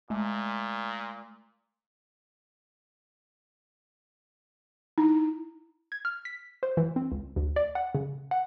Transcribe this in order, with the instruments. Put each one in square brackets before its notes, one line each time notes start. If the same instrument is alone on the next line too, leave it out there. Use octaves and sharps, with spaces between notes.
[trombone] A#2 [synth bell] G#3 A3
[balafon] D#4 [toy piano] E4
[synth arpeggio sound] G#6
F6
B6
C5
E3
C4
C#2
D2
D5
F#5
C#3
F#5